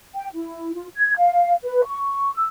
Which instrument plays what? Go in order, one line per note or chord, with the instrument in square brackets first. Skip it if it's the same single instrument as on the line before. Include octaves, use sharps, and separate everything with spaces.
[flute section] G5
E4
F4
G#6
F5
B4
C#6
E6